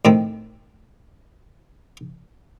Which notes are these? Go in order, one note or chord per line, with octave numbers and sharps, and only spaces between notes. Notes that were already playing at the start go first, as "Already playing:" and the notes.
A2 D#3 C4